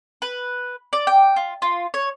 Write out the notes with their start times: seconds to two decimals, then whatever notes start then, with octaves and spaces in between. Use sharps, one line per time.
0.22 B4
0.93 D5
1.07 G5
1.36 F4
1.62 F4
1.94 C#5